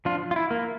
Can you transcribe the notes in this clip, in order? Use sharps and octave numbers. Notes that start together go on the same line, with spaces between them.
F3 D4 F4
F4
E4
A#3